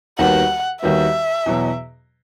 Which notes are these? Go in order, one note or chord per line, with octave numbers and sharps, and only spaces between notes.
D#2 D#3 G3 B3 F#4 F#5
D#2 D#3 G3 B3 F#4 E5
E2 B2 F#3